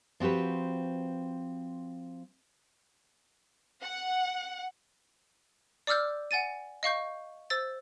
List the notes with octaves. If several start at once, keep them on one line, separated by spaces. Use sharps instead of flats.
F3 C4 F#4 G4 B4
F#5
D5 D6 E6 F6 G6
F#5 G#5 A6 D#7
D#5 F5 C#6 G6
C5 E6 A6